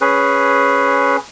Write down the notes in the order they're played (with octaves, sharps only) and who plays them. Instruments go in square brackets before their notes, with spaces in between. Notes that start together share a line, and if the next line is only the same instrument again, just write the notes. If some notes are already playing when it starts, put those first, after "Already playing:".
[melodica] C#4 G#4 B4